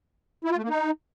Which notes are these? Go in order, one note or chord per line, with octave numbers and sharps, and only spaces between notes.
E4
F4
A3
A#3
D#4